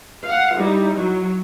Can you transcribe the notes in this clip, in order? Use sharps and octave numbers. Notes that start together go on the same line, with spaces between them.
F5 F#5
G3 D#4 E4
F#3